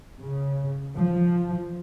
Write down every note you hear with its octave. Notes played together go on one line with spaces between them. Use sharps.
C#3
F3